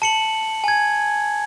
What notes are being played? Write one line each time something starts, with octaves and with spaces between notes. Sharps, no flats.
A5 C#7 F#7
G#5 G#6